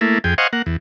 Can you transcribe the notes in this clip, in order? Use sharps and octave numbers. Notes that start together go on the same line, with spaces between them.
A3 A#3 E4
F2 G#4 G5
C5 D#5 F5 F#5 G#5 C#6
A#3 F#5
E2